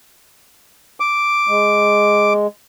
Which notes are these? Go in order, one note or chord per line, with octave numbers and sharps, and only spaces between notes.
D6
G#3